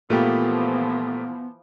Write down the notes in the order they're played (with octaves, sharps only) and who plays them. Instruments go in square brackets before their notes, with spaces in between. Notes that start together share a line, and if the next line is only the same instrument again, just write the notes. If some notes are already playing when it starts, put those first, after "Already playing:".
[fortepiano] A#2 A3 G4 [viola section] E3 F3 [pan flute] B3